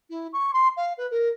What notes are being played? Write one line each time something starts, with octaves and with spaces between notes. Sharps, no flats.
E4
C#6
C6
F5
B4
A#4